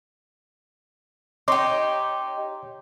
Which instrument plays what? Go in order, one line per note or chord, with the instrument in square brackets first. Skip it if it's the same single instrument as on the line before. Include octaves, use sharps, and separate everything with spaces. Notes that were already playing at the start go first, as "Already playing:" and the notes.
[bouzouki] D#4 G4 [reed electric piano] C#5 C6 D6